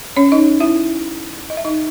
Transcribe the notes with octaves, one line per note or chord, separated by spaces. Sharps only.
C#4 C#5
D#4 D#5
E4 E5
D#5
E5
D#4 D#5